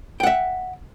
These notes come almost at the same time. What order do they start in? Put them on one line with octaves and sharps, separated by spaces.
G5 F#5 E5